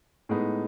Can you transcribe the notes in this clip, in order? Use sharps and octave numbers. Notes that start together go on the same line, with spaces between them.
A2 G#3 B3 D#4